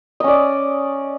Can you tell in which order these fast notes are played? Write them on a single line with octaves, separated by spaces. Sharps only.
D#5 C#4 D5